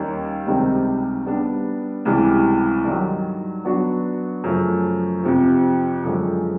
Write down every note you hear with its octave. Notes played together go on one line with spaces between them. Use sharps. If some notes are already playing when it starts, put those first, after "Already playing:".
Already playing: D#2 D#3 G3 A#3 C#4
C#2 C3 D#3 G3 C4
G3 B3 D4
C#2 C3 E3 G3
G2 D#3 F#3
F#3 B3 D4 F#4
F#2 C#3 F3 A3
F2 C3 F3
F#2 D3 F3 G#3